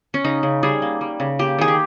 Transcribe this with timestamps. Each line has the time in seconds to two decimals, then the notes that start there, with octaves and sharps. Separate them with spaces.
0.14 C#4
0.24 C#3 D#4
0.43 C#3
0.63 G3 G#4
0.82 A#3
1.01 G3
1.20 C#3
1.39 A#3 G4
1.58 D#3 G#4
1.68 G4